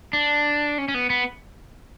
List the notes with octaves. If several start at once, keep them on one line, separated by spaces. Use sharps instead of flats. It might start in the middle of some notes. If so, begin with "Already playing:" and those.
D4
C#4
C#4
B3
B3